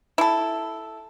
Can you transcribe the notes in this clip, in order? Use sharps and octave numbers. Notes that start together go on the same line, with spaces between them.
E4 A4